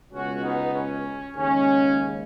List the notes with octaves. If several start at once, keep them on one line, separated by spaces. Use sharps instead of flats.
C#2 B2 G#3 C#4 F#4
B3 D#4
C#4
D#2 C#3 G#3 C#4